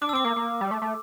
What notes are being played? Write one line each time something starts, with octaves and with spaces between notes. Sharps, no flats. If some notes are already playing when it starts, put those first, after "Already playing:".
D4 D6
E6
C4 D6
A#3
A#3
G3
A3
A3